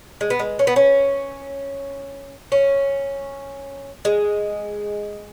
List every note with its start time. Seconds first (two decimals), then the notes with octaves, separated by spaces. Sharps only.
0.21 G#3
0.30 B3
0.39 G#3
0.59 C#4
0.67 B3
0.76 C#4
2.52 C#4
4.05 G#3